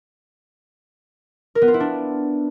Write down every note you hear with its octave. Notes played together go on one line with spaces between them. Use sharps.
A#4
B3
F4
E4
D4